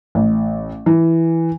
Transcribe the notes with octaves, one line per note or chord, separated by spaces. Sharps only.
A1
E3